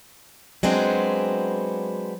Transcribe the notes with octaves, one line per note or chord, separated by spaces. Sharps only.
F#3 G#3 B3 C4 D4